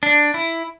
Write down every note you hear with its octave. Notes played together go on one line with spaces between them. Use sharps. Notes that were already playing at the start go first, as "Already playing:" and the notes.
D4
E4